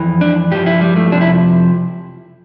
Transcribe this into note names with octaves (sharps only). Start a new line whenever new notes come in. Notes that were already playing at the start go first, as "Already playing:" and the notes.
Already playing: F2 E3
D4
G2 F3 G4
E4
G3
A3
F2 C3 F3 D4
E4